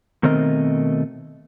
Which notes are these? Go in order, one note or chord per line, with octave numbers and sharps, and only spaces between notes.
B2 D#3 A3 C4 A#4 D#5